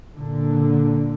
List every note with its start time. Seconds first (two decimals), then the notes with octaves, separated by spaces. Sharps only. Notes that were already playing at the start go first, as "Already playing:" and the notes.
0.17 A#2 D3